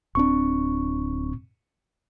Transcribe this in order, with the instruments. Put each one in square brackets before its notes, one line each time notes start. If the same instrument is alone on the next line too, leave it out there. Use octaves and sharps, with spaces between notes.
[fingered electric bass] D1 D4 [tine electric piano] C4 C#6